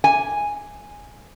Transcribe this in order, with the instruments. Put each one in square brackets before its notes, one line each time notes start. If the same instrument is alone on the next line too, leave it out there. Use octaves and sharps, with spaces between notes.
[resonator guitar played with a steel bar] G#5